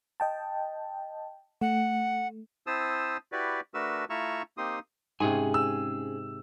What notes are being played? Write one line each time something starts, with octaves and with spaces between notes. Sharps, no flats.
D#5 G5 A5
A3 F#5
C4 E4 C5 A5 D#6 E6
E4 F#4 G4 B4 D5
A3 D4 F#4 A#4 B4 E6
A3 E4 F4 A#5 C#6 E6
A#3 C4 D#4 G4 C6 D#6
G#2 C3 C#4 G#4 G#5
E6